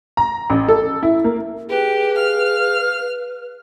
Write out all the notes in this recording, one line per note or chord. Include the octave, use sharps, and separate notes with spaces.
A#5
A1
A4
E4
A#3
G4 G#4 B4
F5 F6